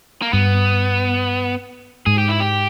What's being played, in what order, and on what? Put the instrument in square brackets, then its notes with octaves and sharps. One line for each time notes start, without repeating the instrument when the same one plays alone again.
[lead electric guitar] A#3
[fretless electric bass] G2 [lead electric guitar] B3
[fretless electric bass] G#2 [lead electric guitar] G#4
[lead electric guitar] G4
E4
G4